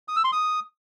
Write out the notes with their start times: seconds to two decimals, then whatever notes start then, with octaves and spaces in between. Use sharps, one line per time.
0.08 D#6
0.16 E6
0.24 C6
0.32 D#6